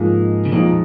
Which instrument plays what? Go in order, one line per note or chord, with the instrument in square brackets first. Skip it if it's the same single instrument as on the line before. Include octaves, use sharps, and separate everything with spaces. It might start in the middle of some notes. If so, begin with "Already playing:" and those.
Already playing: [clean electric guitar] G#2 [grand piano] F3 A#3 D#4 G#4
[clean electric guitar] C#3
[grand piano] F2 F3 G#3 D#4 [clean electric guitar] A#2